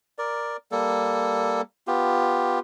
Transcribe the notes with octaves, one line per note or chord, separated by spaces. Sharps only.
A#4 D5
G3 A#3 A4
B3 F4 G4